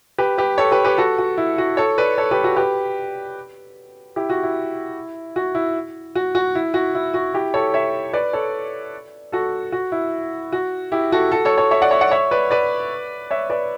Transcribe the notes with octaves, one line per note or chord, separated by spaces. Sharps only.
G4 B4
G4 B4
A4 C#5
G4 B4
G4 B4
F#4 A4
F#4
E4
F#4
A4 C#5
B4 D5
A4 C#5
G4 B4
F#4 A4
G4 B4
E4 G4
F#4
E4
F#4
E4
F#4
F#4
E4
F#4
E4
F#4
E4 G4
A4 C#5
C#5 E5
B4 D5
A4 C#5
F#4 A4
F#4
E4
F#4
E4 G4
F#4 A4
F#4 A4
A4 C#5
A4 C#5
C#5 E5
D5 F#5
C#5 E5
D5 F#5
C#5 E5
B4 D5
B4 D5
C#5 E5
B4 D5